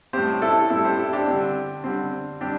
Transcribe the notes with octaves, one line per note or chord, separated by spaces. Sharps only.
A2 G3 C4 G4 C5
E4 A4
A2 G3 C4 E4 A4
G4 C5
E4 A4
D4 G4
D3 G3 C4
D3 G3 C4
G3 C4 D4 G4